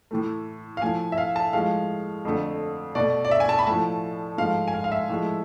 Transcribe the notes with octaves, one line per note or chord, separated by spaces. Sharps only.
A2 E3 A3
F5
A2 F3 A3 G#5
E5
F5
A5
A2 F3 G#3 F5
F2 D3 A3
B2 A3 D5
D5
E5
G#5
A5
B5
A2 F3 A3 A5
G#2 F3 A3 F5
G#5
F5
F5
E5
A2 F3 G#3